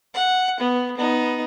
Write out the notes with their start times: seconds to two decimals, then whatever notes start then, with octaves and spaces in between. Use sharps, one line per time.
0.14 F#5
0.60 B3
0.97 B3 D#4